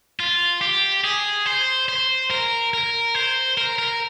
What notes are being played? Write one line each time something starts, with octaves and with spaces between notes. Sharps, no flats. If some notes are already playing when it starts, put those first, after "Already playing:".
F4
G4
G#4
C5
C5
A#4
A#4
C5
A#4
A#4